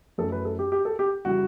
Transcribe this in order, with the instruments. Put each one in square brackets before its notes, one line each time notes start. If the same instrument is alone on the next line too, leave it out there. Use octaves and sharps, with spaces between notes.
[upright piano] F#2 E3 A3 A4
B4
A4
G4
G4
A4
G4
C#3 E3 G3 F#4